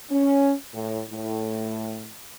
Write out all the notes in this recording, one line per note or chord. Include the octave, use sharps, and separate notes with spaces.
C#4
A2
A2